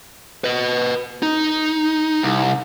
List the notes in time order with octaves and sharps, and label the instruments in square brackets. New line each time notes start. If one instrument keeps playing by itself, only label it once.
[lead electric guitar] B4 D#5
D#4
C2